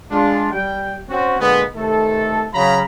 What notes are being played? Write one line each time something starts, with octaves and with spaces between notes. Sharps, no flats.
G#3 D4 F4
G3 G5
C4 C#4 F#4
A#2 D3 G#3 B3
C3 D#3 A3 A4
C#3 F#3 F5 A#5 B5